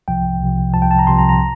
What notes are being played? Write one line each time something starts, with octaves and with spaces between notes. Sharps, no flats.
C2 C3 F3 G5
C2 C3 F3
C2 C3 F3 A5
G5
A5
A#5
C2 C3 F3 C6
A#5
A#5